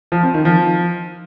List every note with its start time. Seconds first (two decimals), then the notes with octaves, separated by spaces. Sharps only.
0.12 F3
0.23 C4
0.34 D#3
0.45 F3